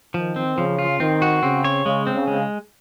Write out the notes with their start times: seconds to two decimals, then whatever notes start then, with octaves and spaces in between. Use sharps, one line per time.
0.14 D#3 F3
0.36 C4
0.57 C#3 F3
0.79 F4
1.00 D#3 C4
1.22 F#4
1.43 C#3 C4
1.64 C#5
1.86 C#3 G#3
2.07 C4
2.14 C#3
2.28 G#3